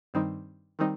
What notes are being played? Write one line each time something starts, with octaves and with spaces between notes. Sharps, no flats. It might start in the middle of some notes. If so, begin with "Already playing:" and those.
G2 D#3 G3 C4 D#4
D#3 G3 C4 D#4